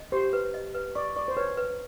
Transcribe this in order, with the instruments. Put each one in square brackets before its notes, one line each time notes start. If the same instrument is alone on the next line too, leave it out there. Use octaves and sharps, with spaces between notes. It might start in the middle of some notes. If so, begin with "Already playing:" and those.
Already playing: [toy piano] D#5
[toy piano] G4 [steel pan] C5
[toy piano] B4
D#5
B4
[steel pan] D5 [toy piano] C#6
[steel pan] D5 [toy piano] C#6
[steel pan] C5
[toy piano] B4 [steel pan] C#5
[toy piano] B4